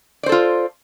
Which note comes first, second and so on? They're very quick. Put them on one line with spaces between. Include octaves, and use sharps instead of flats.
D5 C5 A4 F4